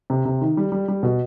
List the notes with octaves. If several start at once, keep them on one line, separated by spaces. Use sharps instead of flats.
C3
C3
D#3
G3
G3
G3
B2